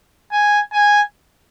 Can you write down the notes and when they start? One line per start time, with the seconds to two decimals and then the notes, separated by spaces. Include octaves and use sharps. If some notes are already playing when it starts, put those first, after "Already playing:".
0.32 G#5
0.73 G#5